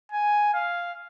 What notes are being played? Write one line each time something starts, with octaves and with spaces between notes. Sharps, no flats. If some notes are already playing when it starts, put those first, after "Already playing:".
G#5
F5